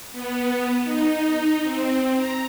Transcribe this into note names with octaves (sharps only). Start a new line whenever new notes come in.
B3
D#4
C4
A#5